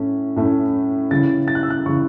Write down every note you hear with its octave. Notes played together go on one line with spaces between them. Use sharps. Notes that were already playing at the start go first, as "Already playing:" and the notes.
Already playing: A2 A3 C#4
A2 A3 C#4
C#3 E3 C#4 E4 A6
A6
F#6
E6
F#6
C#3 E3 C#4 E4 C#6